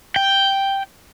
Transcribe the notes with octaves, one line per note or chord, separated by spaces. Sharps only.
G5